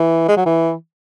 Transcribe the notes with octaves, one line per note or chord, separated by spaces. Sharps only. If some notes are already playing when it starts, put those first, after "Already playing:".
Already playing: E3
G#3
F#3
E3